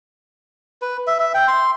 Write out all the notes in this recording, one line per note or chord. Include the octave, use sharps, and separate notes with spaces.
B4
E5
E5
G5
C6